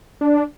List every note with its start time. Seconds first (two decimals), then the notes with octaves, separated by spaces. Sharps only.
0.21 D4